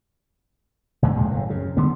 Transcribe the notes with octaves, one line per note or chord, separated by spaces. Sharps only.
F#1 E2 A#2 D3
F1 D2 A#2 G#3
F#1 A2
F#2 C#3
D3 E3 G3 B3